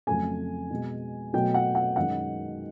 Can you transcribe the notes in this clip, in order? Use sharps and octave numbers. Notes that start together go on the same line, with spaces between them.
F2 C#3 F#3 A3 G#5
B2 G#3
B2 F#3 A3 G5
F#5
F#5
F#2 D#3 G#3 F#5